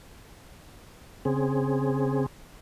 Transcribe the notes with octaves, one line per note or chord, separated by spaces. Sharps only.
C#3 C4 G#4